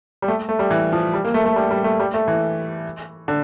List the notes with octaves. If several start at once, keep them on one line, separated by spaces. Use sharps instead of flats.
G3
A3
A3
G3
E3
F3
G3
A#3
A3
A3
G3
G3
A3
G3
A3
E3
D3